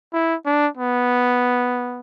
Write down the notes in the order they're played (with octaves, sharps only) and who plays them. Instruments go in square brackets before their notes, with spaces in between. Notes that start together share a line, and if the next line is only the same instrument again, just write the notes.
[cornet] E4
D4
B3